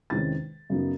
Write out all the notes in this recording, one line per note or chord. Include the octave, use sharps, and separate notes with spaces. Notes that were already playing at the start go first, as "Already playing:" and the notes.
E2 C3 D#3 G#3 C#4 A6
F#2 C#3 F#3 B3 D#4